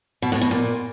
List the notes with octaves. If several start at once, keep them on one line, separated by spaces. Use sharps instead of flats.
B2
A2
B2
A#2